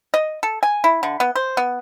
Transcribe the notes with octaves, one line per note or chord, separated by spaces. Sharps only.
D#5
A4
G#5
E4
D3
B3
C5
B3